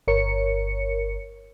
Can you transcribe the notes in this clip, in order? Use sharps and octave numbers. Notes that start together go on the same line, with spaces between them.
G1 A#4 C#5 C#7